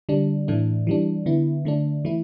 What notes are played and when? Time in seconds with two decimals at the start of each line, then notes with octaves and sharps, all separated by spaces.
0.09 D3 G3 D4
0.48 A2 E3 A3 D4
0.87 E3 G3 D4
1.26 D3 B3 E4
1.65 D3 A3 D4
2.05 E3 A3 E4